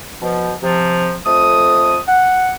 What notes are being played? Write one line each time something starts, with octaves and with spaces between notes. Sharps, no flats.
B2 F3
C3 F3
F2 A3 D#6
F#5